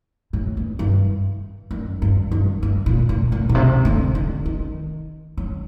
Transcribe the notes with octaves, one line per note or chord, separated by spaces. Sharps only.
A2
G2
G2
F#2
G2
G2
G2
A#2
A#2
A#2
A#2
C3
D3
D3
D#3
F#3